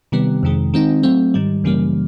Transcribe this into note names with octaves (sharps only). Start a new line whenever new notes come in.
C3 D#3 G3 B3
F2 C3 D#3 G#3
D#3 G#3 C4 D#4
F#3 A3 C4
G#2 D#3 G3
F#2 C#3 E3 G3 A#3